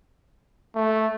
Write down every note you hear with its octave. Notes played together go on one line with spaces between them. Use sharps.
A3